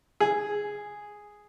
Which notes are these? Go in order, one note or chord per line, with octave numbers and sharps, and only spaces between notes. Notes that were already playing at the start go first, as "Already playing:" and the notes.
G#4